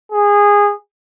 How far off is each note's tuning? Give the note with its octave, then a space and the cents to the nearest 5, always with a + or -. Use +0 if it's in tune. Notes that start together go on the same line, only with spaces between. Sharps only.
G#4 -20